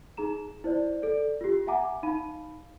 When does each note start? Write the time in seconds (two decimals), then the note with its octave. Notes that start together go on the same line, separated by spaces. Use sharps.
0.17 D#4 G#4 A#5 E7
0.64 E4 C5 D5
1.02 A4 D5
1.41 F4 G4
1.67 E5 F#5 G#5 A#5 D6
2.03 D#4 F5 B5 D#7